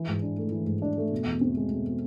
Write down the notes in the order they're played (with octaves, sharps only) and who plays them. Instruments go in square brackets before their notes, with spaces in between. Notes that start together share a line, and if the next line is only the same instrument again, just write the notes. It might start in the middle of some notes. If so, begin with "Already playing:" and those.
Already playing: [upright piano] E3
G#2
D4
A3
E3
G#2
D4
A3
B2
E2
C4
G#3
B2